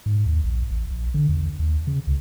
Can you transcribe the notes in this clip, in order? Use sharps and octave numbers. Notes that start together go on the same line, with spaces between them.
G#2
D#2
A#1
A1
A#1
D3
E2
D#2
C#3
C#2